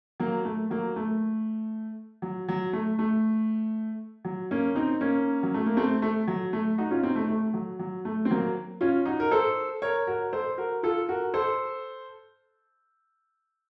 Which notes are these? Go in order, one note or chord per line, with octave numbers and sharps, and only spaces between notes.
F#3 A#3
A3
F#3 A#3
A3
F#3
F#3
A3
A3
F#3
A#3 C#4
C4 D#4
A#3 C#4
F#3
A3
A#3
A3 C4
A3
F#3
A3
D#4 F#4
C#4 F4
C4 D#4
A3
A3
F#3
F#3
A3
C4
F#3 A#3
C#4 F4
D#4 F#4
A#4
A4 C5
A#4 C#5
F#4 A#4
A4 C5
F#4 A#4
F4 A4
F#4 A#4
A4 C5